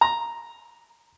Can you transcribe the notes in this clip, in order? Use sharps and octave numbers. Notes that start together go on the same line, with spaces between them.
A#5